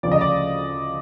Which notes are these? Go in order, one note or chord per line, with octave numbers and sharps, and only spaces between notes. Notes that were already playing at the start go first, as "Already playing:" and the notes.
D2 C#3 F3 D5
D#5
D5